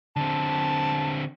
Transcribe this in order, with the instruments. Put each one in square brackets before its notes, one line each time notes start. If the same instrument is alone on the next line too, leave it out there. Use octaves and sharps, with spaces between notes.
[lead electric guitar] D3 C4 [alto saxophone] A5